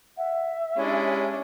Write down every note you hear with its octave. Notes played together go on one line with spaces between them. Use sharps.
E5 F#5
G#3 C#4 D4 E4 G4 C#5